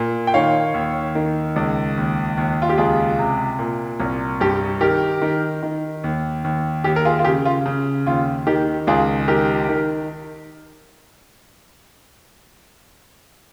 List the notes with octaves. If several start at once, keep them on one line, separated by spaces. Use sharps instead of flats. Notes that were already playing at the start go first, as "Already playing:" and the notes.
Already playing: A#2
G5
D#3 C#5 F5
D#2
D#3
C#2
D#2
D#2
F4
G4
C#2 F4 G#4
C3
A#2
C2
G2 G4
D#3 G4 A#4
D#3
D#3
D#2
D#2
D#2 G4
A#4
F4 G#4
F4
C#3 G4
F4
C#3
D#2 F4
D#3 G4
C#2 F4 G#4
D#3 G4 A#4
D#3